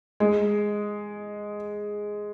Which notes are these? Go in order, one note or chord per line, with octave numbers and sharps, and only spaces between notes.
G#3